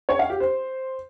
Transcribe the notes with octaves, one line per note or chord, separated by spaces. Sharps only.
C#5
F5
G4
C5